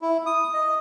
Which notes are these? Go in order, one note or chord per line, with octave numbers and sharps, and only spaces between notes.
E4
D#6
D#5